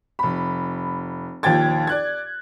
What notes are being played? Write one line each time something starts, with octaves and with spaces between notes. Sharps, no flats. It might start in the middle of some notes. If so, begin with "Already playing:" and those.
F1 B5
A#1 D#2 F3 G5 G#6 A6
D5 F#6 G#6